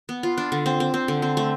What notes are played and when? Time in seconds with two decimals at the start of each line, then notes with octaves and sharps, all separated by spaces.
0.09 B3
0.23 F4
0.38 D4
0.52 D3
0.66 C4
0.80 C4
0.94 C4
1.08 D3
1.22 C4
1.37 A3